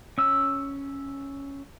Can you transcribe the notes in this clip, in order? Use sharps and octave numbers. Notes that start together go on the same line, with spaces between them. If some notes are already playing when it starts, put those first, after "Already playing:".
C#4 E6